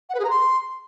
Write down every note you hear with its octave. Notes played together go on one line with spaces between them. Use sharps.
F#5
B4
G#4
A#5
C6